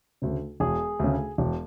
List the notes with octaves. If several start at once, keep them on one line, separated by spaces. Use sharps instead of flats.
D2 C#3
E1 G#4
D2 C#3
E1